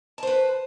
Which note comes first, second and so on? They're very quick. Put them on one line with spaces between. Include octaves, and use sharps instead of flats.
A5 C5 B4